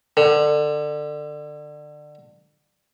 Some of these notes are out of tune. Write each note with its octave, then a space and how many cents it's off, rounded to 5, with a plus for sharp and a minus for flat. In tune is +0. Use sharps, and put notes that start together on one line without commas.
D3 +25